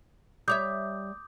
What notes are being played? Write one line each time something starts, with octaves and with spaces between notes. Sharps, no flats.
G3 C#5 E5 D6 D#6 G6